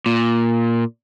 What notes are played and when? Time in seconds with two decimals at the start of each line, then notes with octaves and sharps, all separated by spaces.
0.06 A#2